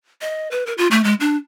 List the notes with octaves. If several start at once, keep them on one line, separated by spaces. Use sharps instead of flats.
D#5
B4
A#4
F4
A3
G#3
D4